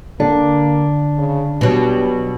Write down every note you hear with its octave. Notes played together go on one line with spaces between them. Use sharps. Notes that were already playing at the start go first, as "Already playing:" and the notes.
D3 A#3 D4
C#3
B2 F#3 G3